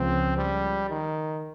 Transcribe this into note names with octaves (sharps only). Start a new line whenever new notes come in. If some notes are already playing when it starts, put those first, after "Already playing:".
Already playing: C#2 C#3 F3 C4
G3
D#3